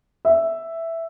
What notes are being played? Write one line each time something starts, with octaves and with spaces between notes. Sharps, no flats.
E5